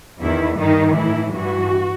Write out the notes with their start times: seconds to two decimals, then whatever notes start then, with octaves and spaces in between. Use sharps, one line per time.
0.19 E2 D#3 E4
0.57 G2 D#3 D#4
0.95 A2 E3 E4
1.33 G2 E3 F#4